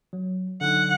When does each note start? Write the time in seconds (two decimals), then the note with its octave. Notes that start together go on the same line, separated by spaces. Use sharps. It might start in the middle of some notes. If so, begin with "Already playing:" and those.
0.13 F#3
0.61 D3 F#3 D#4 F#5